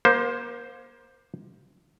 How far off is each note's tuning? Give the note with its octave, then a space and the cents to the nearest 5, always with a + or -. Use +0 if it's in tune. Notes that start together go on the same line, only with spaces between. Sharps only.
A#3 +35 C5 +0